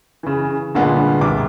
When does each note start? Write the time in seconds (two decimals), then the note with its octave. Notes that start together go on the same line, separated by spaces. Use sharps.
0.23 C#3 E3
0.75 G2 A#2 D3 G#3 B3
1.21 C2 D6